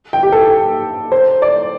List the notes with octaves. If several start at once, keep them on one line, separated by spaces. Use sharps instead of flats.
G5
G4
A4
C5
D5